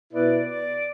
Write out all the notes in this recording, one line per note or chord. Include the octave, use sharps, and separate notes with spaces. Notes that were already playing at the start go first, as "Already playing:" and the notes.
B2 B3 E4 B4 D5
D5